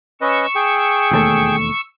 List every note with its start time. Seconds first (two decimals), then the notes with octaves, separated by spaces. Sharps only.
0.21 C#4 B4 D#5 C#6 E6
0.55 G#4 G5
1.11 E1 D#2 A3